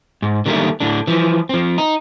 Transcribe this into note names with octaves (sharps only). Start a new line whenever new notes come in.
G#2
D3 D#3 G3 A3 A#3
A2 D3 D4
E3 F3
F3 C4
D#4